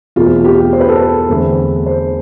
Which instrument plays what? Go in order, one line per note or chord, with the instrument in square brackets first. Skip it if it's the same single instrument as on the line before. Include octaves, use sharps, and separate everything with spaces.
[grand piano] E2 B2 A3 C4 F4
G4
C5
B4
A4
B4
E2 D3 A3 C4
C5